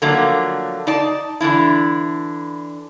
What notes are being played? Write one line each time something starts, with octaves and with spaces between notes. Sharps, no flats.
D3 F3 F#3 A3 A#3
D#4 D5 A5
D3 E3 D4 E4